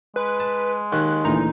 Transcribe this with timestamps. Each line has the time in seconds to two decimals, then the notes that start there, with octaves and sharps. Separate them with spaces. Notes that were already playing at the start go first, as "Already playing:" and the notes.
0.16 G#3 B4
0.40 A5
0.92 D#2 D#3 F#6
1.25 D2 A#2 E3 D#4